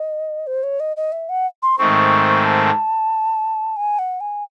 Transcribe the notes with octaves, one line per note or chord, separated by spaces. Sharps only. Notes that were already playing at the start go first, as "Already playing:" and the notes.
Already playing: D#5
C5
C#5
D#5
D#5
E5
F#5
C6
G#2 D#3 A3 C4 C#6
A5
G#5
F#5
G#5